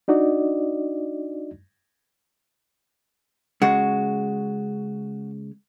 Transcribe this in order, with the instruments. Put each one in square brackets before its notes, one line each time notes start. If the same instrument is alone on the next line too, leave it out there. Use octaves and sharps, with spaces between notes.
[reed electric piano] D4 D#4 F#4 D5 D#5
[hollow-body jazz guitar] C#3 G#3 [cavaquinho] F#4